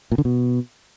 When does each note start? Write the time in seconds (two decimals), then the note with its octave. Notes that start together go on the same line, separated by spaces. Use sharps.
0.12 A#2
0.18 D3
0.25 B2